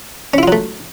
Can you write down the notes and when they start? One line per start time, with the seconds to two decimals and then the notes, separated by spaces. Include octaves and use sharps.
0.34 C#4
0.38 E4
0.43 F4
0.48 F#3
0.52 A3